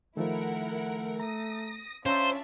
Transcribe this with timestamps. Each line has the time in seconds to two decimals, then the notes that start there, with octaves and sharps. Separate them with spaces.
0.17 D#3 F3 A3 E4 A#4 F#5
1.20 A#5 D#6 A#6
2.06 C#4 D4 F4 C5 E5 F5 A#5 E6